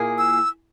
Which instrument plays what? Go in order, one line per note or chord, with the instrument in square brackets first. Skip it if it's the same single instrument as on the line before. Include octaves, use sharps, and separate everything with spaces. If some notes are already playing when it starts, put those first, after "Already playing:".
Already playing: [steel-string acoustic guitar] A#2 A#3 E4 G#4
[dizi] E6